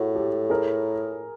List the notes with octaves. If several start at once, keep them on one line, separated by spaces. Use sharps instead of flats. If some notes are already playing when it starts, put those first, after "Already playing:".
Already playing: A2 F#4 G#4
G4 A4
G#4 A#4